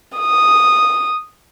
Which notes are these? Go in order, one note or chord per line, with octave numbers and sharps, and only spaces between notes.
D#6